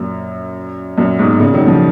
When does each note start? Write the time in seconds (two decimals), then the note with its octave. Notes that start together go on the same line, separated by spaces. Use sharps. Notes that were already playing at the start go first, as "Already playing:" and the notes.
Already playing: F#2 A#2
0.98 F#2 A#2
1.19 G#2 B2
1.39 A#2 C#3
1.54 D#3 F#3
1.67 C#3 F3